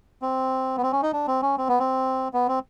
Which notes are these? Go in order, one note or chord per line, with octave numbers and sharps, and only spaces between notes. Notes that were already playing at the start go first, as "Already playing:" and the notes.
C4
B3
C4
C#4
D#4
D4
C4
C#4
C4
B3
C4
B3
C4